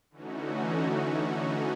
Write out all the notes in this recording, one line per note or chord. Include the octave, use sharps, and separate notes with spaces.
D3 E3 A3 C#4 D#4 F#4